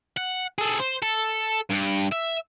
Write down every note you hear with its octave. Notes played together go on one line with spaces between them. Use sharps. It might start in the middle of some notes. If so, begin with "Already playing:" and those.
F#5
G#4 A4
C5
A4
G2
E5